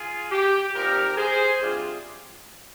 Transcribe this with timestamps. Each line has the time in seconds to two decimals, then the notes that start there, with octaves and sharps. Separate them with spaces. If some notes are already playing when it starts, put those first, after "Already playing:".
Already playing: F4 G#4
0.31 G4
0.74 A#2 F3 C4 D#4 G4 A#4
1.17 G#4 C5
1.60 C3 G3 D4 F4